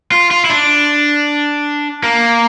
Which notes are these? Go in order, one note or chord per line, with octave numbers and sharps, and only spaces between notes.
F4
F4
E4
D4
A#3